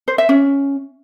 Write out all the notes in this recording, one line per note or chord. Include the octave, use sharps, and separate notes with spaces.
C5
E5
C#4